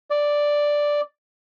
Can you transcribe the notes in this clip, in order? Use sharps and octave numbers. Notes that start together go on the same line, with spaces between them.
D5